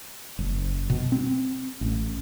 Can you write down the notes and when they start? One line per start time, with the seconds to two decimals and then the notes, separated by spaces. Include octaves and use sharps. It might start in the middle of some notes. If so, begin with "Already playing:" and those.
0.39 F#1
0.90 B2
1.12 C4
1.81 A1